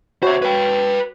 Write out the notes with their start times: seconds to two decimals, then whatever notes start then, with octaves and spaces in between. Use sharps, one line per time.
0.23 F#4 C5 C#5 E5
0.42 B4 G5